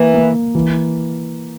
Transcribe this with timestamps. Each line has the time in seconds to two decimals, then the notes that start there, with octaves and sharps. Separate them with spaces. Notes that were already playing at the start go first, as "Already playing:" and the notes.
Already playing: E3 A#3
0.14 A#3
0.55 E3